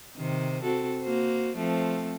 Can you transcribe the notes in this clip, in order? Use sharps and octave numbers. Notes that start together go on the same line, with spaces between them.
C3 D#3 C5
C4 F#4 A4
A#3 F#4 C5
F3 A3 C4